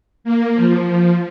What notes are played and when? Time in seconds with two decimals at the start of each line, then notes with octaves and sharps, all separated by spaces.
0.24 A#3
0.54 F3
0.84 F3